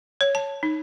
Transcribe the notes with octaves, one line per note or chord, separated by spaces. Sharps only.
C#5
A5
D#4